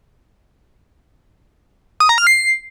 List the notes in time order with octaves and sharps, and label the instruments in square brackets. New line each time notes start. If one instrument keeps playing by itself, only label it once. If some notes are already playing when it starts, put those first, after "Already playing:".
[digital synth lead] D#6
A#5
F6
C7